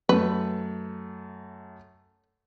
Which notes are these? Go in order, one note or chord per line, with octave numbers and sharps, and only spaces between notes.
F#2 A3 B4